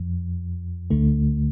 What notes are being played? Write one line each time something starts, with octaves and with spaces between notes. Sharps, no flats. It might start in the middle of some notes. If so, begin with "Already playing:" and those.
Already playing: F2 F3
D2 D3 A3